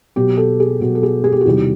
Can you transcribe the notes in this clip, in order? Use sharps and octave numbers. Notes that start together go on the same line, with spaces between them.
B2 F#3 B3 G4
A4
G#4
B2 F#3 B3 F#4
A4
G#4
G#4
G4
F#4
E2 C3 D#3 G3 C4 G4